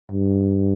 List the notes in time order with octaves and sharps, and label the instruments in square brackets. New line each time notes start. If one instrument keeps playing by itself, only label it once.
[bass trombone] G2